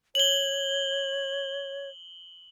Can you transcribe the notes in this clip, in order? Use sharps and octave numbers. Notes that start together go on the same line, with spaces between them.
C#5 F#7 G7